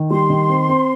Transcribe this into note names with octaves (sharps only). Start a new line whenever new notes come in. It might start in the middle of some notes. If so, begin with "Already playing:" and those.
Already playing: D#3
G3 C6
D#3
C4
C4